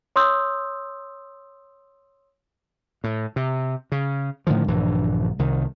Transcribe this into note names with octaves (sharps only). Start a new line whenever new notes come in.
C#5 C6 D#6 E6 G6
A2
C3
C#3
A2 D3 D#3 F3
A#1 G2 D3 E3
C2 D#3